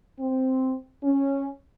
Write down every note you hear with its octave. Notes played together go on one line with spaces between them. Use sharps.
C4
C#4